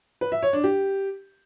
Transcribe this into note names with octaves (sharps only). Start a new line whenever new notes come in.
B4
E5
C#5
D4
G4